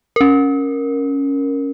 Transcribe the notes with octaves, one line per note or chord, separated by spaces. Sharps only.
C#4 A#4